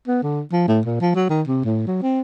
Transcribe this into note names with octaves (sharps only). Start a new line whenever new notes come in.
B3
D3
F3
A2
A#2
F3
F#3
D#3
C3
A2
F#3
C4